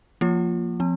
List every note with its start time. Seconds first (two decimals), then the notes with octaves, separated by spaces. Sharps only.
0.21 F3 A#3 F4
0.80 F3 C4